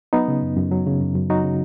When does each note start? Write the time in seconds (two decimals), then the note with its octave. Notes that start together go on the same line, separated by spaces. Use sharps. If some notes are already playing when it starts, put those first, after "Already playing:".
0.13 F#3 B3 D#4
0.28 C#3
0.43 F#2
0.57 F#2
0.72 F#3
0.86 C#3
1.01 F#2
1.15 F#2
1.30 F#3 D#4 F#4
1.44 C#3